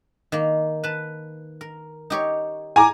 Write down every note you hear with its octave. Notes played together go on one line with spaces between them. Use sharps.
D#3 A#3
B4 A5
A#4
D#4 G4 C#5
G#5 A#5 D6